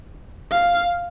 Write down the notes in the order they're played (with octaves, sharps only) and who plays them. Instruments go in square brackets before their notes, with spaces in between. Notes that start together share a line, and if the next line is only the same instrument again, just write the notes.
[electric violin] F5